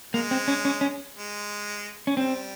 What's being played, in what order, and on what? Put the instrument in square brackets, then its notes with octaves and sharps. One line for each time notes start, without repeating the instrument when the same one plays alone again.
[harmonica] G#3 [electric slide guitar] A#3
[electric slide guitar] C4
C#4
C#4
C#4
[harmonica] G#3
[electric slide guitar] C#4
[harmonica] G3 [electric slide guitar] C4